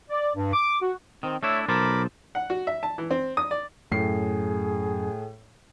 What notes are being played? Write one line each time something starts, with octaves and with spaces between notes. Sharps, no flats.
D5
G2
D6
F#4
D#3 C4
A3 D4 E4 C#5 E5
B1 A#4 C5 A5 B5 D6
F#5
F#4
E5
A5
E3
C4
D#6
D5
F#2 A2 G#4 C7